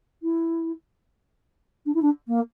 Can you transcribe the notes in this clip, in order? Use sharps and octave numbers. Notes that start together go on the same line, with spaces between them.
E4
D4
E4
D4
A#3